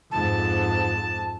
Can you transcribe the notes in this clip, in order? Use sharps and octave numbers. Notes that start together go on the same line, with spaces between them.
F2 G#2 A5